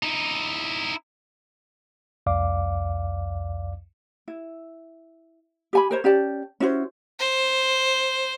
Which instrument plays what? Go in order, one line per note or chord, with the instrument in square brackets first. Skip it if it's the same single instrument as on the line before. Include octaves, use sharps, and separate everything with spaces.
[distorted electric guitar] D#4 E4
[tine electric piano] C2 F2 D5 F5 D6
[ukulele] E4
G4 G#5 B5
A#4 C5 C#5
C#4 G4 D5 A5
C#4 E4 F#4 C5
[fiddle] C5